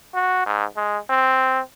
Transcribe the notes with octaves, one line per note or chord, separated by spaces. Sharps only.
F#4
G#2
G#3
C4